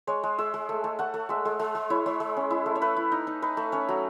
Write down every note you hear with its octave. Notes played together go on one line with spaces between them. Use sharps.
G#3 C#5
G#3
G#3 E5
G#3
A3
A3
A3 F#5
A3
G#3 E5
G#3
G#3
G#3
E4 C#5
G#3 C#5
G#3
C#4
E4
A3
C#5
A3 B4
E4
D#4
D#4
D#4 B4
A3
C#4 C#5
F#3